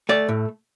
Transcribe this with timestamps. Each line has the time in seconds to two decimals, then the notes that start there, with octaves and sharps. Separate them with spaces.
0.09 A3 D5
0.29 A2